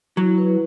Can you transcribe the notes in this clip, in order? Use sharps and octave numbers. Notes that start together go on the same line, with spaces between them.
F#3 E4
B4